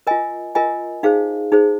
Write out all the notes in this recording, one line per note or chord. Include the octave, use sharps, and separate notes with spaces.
F4 A#4 D#5 G#5
F4 A#4 D#5 G#5
D#4 G#4 C5 F5
D#4 G#4 C5